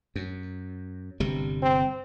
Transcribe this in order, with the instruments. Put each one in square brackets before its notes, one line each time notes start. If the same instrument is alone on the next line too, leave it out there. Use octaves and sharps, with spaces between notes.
[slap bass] F#2
G1 C3 G3
[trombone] C4